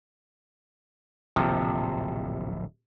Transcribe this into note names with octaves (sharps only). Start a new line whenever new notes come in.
D1 A#1 D#2 C3 F3